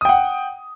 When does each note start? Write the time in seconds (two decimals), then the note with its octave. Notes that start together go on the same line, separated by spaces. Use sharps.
0.01 D#6
0.05 G5
0.09 F#5